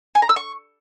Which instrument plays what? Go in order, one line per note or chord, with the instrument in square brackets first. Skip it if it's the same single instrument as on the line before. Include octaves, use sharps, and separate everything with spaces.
[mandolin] G#5
A#5
E6
C#6